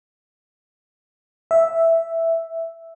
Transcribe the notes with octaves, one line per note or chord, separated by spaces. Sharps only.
E5